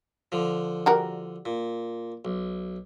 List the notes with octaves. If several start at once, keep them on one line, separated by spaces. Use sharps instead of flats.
D3 F3
G3 F#4 A#4
A#2
B1